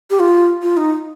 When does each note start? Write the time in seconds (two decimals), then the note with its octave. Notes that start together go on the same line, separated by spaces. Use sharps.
0.10 G4
0.20 F4
0.62 F4
0.77 D#4